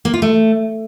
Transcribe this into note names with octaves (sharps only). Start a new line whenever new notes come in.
A#3
F4
A3